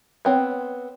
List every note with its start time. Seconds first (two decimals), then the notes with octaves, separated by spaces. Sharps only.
0.25 B3 C4 C#5